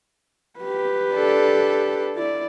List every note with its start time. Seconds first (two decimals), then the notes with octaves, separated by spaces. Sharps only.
0.59 G4 B4
1.13 D4 A4
2.16 E4 D5